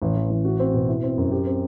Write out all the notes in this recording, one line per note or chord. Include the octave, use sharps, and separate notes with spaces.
A1
E3
A1
F#4
C4
B2
E4
C4
F#2
G4
C4